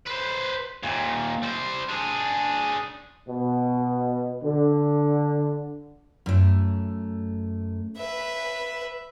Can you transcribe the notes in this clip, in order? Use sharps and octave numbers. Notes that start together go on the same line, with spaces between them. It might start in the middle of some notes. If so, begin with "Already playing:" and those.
B4 C5
D#2 A#2
G3 C5
D4 G#4
B2
D3
F#2 A3
B4 E5